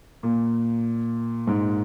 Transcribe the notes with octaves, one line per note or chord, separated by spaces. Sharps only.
A#2
G#2